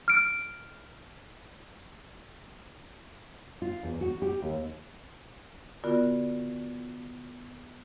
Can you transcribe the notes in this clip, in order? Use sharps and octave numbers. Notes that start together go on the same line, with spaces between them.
F6 D7
F4
E2
F#4
G4
D#2
D3 B3 F4 F#4 A#4 D5